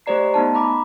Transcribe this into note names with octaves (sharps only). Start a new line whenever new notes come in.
A3 G4 C5 D5 A#5 C7
A3 B3 D#4 A5
A#5 B5 D6